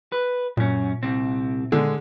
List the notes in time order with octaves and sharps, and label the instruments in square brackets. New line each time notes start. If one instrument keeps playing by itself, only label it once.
[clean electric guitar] B4
[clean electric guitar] F#2 C#4 [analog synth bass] A#2
[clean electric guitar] C2 C4
[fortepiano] D3 [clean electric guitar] G#3